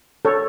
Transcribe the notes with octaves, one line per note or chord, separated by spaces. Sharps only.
A4 C#5